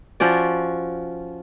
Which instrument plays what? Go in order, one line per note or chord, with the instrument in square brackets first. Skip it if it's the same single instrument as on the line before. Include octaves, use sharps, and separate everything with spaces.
[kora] F3 C#4 F#4 D5